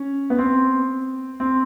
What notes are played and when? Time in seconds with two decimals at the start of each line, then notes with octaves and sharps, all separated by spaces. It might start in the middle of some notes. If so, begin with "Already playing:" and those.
Already playing: C#4
0.30 B3
0.39 C4
1.40 C4